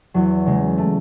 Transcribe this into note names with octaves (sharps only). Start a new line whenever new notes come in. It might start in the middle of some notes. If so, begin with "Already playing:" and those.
E2 F#3
C#3 G#3
A3